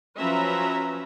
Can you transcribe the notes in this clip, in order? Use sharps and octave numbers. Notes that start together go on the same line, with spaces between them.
F3 F#3 C#4 B4 E5 A#5